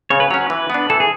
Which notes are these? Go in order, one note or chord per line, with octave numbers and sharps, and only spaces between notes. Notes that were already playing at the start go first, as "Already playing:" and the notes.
C#3 C#5
B4
F#3 C#4 C#5
B4
E3
B3 D4
E3 A4
G#4